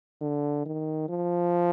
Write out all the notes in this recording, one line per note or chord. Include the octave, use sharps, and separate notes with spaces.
D3
D#3
F3